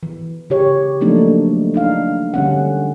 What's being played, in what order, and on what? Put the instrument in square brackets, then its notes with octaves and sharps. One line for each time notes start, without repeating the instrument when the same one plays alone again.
[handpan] E3
C#3 G4 C#5
F3 F#3 A3 A#3 D4 D#4
D4 D#4 F5
D3 G3 C#4 F#5